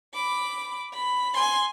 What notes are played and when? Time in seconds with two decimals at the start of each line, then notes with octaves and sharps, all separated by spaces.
0.14 B5 D6
0.94 B5
1.34 G#5 C6